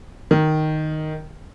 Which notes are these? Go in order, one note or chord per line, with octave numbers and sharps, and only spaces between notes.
D#3